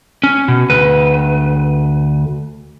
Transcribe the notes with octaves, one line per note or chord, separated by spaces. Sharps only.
C#4
B2
D2 B4